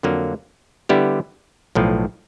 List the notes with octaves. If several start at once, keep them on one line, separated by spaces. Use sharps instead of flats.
F2 D3 F#3 A#3
D3 G3 B3 E4 G4
B1 A2 F3